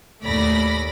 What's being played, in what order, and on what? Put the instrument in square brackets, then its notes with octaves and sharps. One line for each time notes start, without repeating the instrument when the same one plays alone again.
[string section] D#2 A2 A3 D5 B5 A#6